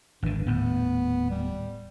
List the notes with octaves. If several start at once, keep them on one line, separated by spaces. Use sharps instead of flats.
G#1 G2 D3
D#1 A2 B3
G3